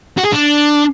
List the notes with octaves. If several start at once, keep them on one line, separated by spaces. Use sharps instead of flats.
F#4
G#4
D4